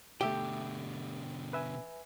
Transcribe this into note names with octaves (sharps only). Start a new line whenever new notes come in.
B2 D3 A3 G4 E5 G5
B4 E5 G#5